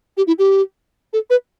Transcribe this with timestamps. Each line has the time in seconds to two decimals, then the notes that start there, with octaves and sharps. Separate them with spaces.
0.17 G4
0.27 E4
0.39 G4
1.13 A4
1.30 B4